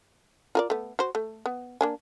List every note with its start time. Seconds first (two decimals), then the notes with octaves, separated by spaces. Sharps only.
0.55 F4 A#4 D5
0.70 A3 B3
0.99 F#4 C5
1.15 A3
1.46 B3
1.81 A#3 D4 G#5